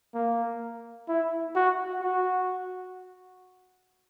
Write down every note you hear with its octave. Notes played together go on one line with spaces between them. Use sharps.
A#3
E4
F#4
F#4